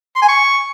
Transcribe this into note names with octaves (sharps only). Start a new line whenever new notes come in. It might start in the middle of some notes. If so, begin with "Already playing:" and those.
C6
G#5
C#6